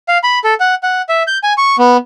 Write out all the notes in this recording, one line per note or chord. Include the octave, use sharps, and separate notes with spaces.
F5
B5
A4
F#5
F#5
E5
G6
G#5
C#6
B3